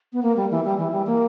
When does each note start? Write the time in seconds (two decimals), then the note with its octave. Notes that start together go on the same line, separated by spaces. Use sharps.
0.13 B3
0.23 A#3
0.36 G3
0.51 E3
0.65 G3
0.78 E3
0.92 G3
1.07 A#3